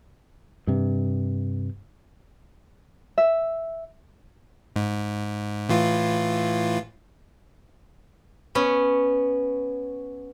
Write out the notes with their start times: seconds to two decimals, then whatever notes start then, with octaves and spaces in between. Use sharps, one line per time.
0.67 G2 C3
3.18 E5
4.76 G#2
5.69 A2 E3 F4
8.55 B3 C#4